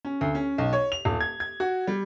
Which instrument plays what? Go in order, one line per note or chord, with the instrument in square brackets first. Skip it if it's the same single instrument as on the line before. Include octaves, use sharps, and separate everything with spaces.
[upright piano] C#4
D2
C#4
B1
C#5
F7
D#1
G#6
G#6
F#4
G3